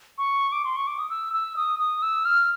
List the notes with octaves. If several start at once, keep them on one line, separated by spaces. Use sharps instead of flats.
C#6
D6
C6
C#6
D6
D#6
E6
E6
D#6
D#6
E6
F6